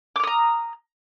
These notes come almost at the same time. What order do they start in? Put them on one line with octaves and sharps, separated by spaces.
D6 F6 D#6 A#5